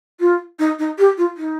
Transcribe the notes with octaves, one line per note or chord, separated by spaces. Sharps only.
F4
D#4
D#4
G4
F4
D#4